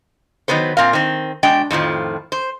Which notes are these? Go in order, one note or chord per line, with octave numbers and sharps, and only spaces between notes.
D#3 F#3 B3 B4 C5
A#2 C4 A#4 F5
D#3 C4
B2 G#3 D4 G5
F2 A2 D#3 F3
C5